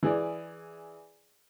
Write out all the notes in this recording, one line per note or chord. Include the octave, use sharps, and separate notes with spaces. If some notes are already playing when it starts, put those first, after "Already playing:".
E3 G#4 D5